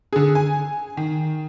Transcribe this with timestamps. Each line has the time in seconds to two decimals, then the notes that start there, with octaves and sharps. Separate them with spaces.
0.13 D3 G#4
0.35 G#5
0.97 D#3